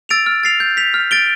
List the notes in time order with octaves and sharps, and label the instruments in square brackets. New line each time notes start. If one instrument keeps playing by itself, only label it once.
[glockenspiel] E6 A6 D7 F7
F6
A6 C7 F7
G6
B6 F7
F6
A6 D7 G7